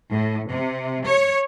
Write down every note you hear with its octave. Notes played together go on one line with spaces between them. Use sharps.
A2
C3
C#5